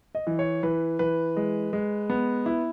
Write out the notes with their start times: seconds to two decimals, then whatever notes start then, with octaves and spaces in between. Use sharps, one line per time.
0.15 D#5
0.27 E3
0.39 C#5
0.63 E3 B4
0.99 E3 B4
1.36 G#3
1.73 G#3
2.10 B3
2.46 E4